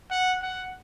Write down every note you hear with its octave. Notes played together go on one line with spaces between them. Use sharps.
F#5
F#5